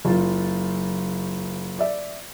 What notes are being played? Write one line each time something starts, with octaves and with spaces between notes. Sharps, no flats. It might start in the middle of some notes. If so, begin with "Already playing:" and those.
F#1 F4
D5 E5